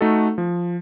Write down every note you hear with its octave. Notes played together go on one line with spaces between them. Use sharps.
A3 D#4 F#4 A4
F3